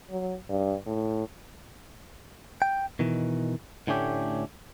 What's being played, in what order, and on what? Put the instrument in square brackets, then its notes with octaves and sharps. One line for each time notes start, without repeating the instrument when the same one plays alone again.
[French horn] F#3
G2
A2
[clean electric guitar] G5
B2 D#3 E3
A2 D3 A3 C#4 G4